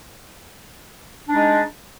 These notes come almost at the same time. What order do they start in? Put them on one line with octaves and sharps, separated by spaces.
D4 D#4 G#3